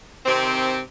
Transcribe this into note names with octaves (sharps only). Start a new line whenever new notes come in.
C3 D#3 C4